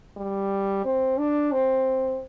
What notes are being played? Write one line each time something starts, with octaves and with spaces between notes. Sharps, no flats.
G3
C4
D4
C4